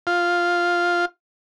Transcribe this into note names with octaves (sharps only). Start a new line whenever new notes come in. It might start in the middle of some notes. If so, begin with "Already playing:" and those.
F4